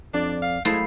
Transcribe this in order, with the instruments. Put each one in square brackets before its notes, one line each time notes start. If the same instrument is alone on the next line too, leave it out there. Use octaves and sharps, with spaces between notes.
[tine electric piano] F2 D5 [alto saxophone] D4
[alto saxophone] F5
[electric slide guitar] F#2 F5 [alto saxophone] G#3 [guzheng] A3 E4 C5